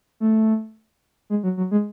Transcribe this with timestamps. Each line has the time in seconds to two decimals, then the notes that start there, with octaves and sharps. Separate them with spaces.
0.20 A3
1.30 G#3
1.43 F#3
1.57 F#3
1.71 G#3